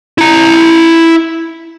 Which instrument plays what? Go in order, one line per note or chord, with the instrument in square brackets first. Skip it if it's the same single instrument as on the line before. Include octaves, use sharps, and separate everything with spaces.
[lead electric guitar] E4 A#5